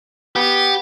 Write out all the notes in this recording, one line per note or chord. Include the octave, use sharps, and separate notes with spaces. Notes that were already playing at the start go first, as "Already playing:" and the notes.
B3 G4